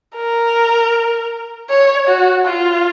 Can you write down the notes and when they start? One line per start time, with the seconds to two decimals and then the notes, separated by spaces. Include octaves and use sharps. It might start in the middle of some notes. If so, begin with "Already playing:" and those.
0.16 A#4
1.70 C#5
2.08 F#4
2.46 F4